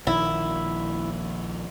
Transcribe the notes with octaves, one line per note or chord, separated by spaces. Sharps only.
A#1 D#3 E4